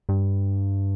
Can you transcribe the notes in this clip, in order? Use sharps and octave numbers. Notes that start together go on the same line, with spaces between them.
G2